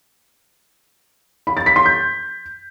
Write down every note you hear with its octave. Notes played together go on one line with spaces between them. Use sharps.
B5
A6
B6
C6
G6